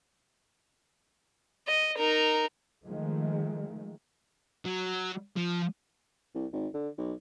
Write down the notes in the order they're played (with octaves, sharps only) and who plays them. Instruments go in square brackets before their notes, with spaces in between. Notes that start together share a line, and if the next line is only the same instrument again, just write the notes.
[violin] D#5
D#4 A#4
[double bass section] D#3 F3 G#3 A3
[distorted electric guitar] F#3
F3
[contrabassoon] C2
G#1
D3
B1